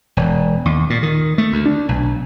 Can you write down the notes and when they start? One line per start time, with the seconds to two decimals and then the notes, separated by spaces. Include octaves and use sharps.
0.17 E1
0.65 D#2
0.90 A#2
1.03 D#3
1.38 A3
1.52 D2
1.66 D4
1.89 B1